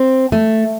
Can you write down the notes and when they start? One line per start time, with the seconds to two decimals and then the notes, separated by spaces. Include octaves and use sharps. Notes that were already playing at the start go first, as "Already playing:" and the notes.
Already playing: C4
0.32 A3